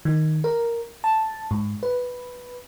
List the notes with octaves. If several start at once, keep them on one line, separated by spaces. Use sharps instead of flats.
D#3
A#4
A5
G#2
B4